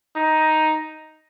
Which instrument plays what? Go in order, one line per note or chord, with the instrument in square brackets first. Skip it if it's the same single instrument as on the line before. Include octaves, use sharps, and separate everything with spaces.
[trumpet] D#4